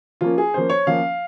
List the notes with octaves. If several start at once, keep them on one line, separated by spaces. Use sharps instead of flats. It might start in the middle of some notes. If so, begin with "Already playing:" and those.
F3 A#3 C#4 F4
G#4
F3 A#3 C#4 C5
C#5
F3 A#3 C#4 F5